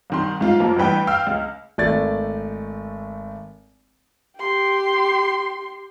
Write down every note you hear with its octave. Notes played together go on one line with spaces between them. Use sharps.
C2 D#3 C6
G#2 F4 F5
F#2 F3 A#3
A1 G2 E3 B4 G5
F5 G5 E6 F6
C#2
G#1 A3 D5 G#6 A6
G4 C6